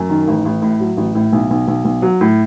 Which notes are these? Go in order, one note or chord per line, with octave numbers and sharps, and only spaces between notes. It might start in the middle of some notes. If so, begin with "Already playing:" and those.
Already playing: F#2
D#3
A1
A1
A2
F#3
A1
A2
B1
B1
B1
B1
F#3
A2